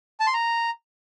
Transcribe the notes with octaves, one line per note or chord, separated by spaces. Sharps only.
A5
C6
A#5